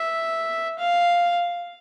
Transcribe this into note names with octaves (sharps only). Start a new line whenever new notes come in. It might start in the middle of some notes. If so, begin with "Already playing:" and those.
Already playing: E5
F5